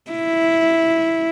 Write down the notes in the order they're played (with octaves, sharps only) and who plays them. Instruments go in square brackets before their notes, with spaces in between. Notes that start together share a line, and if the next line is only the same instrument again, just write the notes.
[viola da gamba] E4